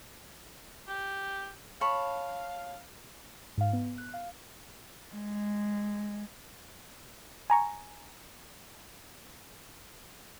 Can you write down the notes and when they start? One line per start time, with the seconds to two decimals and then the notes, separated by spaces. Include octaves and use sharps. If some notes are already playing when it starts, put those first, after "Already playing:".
0.88 G4
1.81 C#5 F5 A5 B5
3.58 G#2 F5
3.73 B3
3.98 F#6
4.14 F5
5.14 G#3
7.50 G#5 A#5 C#6